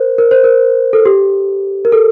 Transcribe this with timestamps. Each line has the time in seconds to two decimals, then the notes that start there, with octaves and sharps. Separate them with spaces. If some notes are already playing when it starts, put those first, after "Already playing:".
Already playing: A#4 C5
0.18 A#4
0.31 C5
0.44 A#4
0.93 A4
1.05 G4
1.85 A#4
1.92 A4